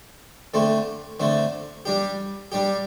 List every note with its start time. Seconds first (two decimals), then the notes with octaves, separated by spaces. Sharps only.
0.54 D3 A3 C4
1.20 D3 A3 C4
1.85 G3 D4 G4
2.52 G3 D4 G4